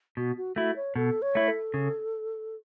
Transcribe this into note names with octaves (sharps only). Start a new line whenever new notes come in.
B2 F#4
F#4
A3 E4 F#4
C#5
B2 A4
C#5
A3 E4
A4
C#3